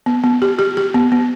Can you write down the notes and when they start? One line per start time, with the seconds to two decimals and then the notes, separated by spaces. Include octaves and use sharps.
0.06 B3
0.24 B3
0.42 G4
0.59 G4
0.77 G4
0.94 B3
1.12 B3